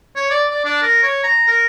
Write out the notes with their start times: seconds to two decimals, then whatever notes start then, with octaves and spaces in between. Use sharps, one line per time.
0.16 C#5
0.30 D5
0.50 D5
0.65 D4
0.82 A#4
1.03 C#5
1.23 A#5
1.47 A#4